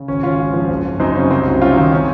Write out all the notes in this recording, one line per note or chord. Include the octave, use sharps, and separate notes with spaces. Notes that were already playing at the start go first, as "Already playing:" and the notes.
Already playing: C#3
G#1 C#4
G#1 C#4 F4
G#2
F3
F#1
F#1
F#2 C4 D#4
C#3 C#4
C2 C4 D#4
F#3
C3 C#4 F4
D#3 C4 D#4
C#4